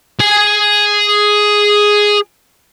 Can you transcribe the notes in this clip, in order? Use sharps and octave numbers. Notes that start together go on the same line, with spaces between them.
G#4 G#5